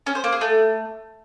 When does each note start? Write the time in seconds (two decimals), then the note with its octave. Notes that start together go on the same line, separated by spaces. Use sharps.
0.06 C#4
0.15 C5
0.24 A#3
0.32 G#4
0.41 A3